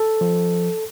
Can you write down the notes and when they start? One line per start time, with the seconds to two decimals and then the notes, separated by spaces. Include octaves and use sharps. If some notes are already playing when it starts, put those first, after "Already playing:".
Already playing: A4
0.21 F3